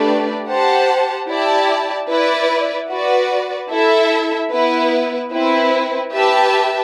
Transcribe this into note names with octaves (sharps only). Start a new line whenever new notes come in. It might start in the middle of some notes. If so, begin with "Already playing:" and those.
Already playing: A3 D4 G4 B4 D5
G4 C5 F#5 A5
E4 G4 D5 A5
E4 B4 D5
F#4 B4 D5
E4 A4 E5
B3 E4 B4
C4 E4 B4
G4 B4 E5 A5